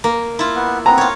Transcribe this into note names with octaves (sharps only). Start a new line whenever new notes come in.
A#3
E4 F4
B3
B3 C4 A#5
F4 C#5